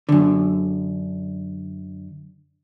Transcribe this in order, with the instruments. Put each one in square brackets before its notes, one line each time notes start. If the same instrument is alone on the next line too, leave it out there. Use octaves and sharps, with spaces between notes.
[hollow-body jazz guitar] F#2 D3